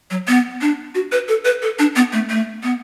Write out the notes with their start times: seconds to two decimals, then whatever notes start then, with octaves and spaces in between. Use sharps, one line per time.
0.11 F#3
0.28 B3
0.61 D4
0.95 F#4
1.12 B4
1.28 A4
1.45 B4
1.62 A4
1.79 D4
1.96 B3
2.13 A3
2.30 A3
2.63 B3